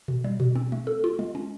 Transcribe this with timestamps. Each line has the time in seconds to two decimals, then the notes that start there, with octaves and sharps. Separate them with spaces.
0.08 B2
0.24 G3
0.40 B2
0.55 C4
0.72 A3
0.87 A4
1.04 F4
1.19 G#3
1.35 C#4